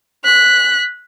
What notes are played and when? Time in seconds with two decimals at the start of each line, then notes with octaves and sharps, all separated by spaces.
0.24 F#6 B6